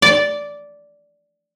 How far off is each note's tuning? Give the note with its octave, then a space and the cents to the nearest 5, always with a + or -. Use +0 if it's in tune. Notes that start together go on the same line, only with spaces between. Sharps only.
D5 -10